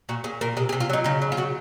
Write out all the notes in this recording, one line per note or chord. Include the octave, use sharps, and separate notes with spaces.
A#2 F#4
A#2 G#4
A#2 A#4
C3 G#4
G#4
C3
F4
F#3 D#4
C#3 D#4
F#3
F4
C#3 F#4